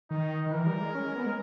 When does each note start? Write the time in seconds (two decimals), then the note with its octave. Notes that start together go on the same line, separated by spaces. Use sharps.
0.10 D#3 D#4
0.46 D#3
0.52 E3 A#4
0.66 G3
0.80 G#3
0.94 C#4
1.05 C#4
1.16 B3
1.26 G#3